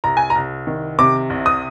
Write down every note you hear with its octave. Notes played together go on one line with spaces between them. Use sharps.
C2 A#5
G#5
A#5
C2
D#3
C3 D6
C2
D#6